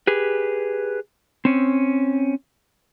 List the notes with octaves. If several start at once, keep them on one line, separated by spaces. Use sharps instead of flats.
G4 G#4 B4
C4 C#4